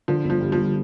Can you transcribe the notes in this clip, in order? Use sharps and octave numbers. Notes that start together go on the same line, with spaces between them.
D3 F3
G1
F3
G2
F3
G1